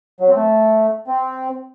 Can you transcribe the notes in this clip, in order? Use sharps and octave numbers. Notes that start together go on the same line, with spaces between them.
F#3
C4
A3
C4